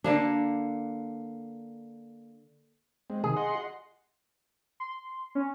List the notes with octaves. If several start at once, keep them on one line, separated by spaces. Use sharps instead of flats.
D3 A#3 D4
G#3 C4
C3 D#3 G#4
D#5 F#5 C6
C6
C#4